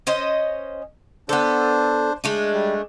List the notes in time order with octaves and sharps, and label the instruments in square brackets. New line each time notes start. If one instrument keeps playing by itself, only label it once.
[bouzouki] C#4 C5 D#5
[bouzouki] B3 A4 [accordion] D4 C5
[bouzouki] G#3 A3 D4
[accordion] G3